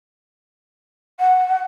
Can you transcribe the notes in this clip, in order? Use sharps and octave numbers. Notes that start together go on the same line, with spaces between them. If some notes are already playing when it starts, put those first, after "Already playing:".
F#5